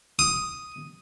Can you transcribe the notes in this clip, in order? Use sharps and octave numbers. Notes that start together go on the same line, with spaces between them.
D#6